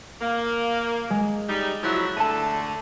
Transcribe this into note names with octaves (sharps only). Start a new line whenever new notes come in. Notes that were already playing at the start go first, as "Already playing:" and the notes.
A#3
G#3
G3 D#4
F3 F#3 E4 F#6
D3 A3 A5 D#7